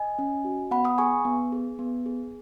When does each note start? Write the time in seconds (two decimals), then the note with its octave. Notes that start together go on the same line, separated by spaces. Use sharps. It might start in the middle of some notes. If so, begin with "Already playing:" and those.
Already playing: D#5 G#5
0.19 C#4
0.45 F#4
0.71 B3 F#5 B5
0.85 B5 D#6
0.98 G#4 G#5 C#6
1.25 B3
1.52 G#4
1.79 B3
2.06 G#4